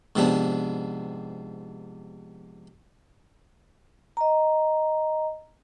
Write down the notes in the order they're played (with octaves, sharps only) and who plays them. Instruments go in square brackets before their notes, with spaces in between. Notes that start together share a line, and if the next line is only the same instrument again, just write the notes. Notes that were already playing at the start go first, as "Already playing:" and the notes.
[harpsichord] G#2 C3 F3 B3 D4
[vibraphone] D#5 A#5